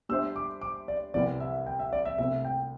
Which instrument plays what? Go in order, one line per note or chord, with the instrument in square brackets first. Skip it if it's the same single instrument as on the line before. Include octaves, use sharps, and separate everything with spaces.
[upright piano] G3 D4 C5 E5 [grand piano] E6
[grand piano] D6
D6
D5
[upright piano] C2 C3 E3 G3 C4 [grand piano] D5
[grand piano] E5
G5
E5
D5
E5
[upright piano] C2 C3 A3 C4 [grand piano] E5
[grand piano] G5